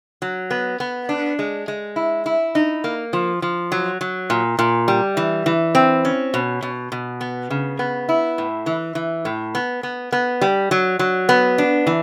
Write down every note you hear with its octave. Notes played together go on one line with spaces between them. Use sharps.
F#3
B3
B3
D4
G#3
G#3
E4
E4
D#4
A#3
F3
F3
F#3
F#3
A#2
A#2
G3
E3
E3
C4
C#4
B2
B2
B2
B3
C#3
B3
E4
A2
E3
E3
A2
B3
B3
B3
G3
F#3
F#3
B3
D4
E3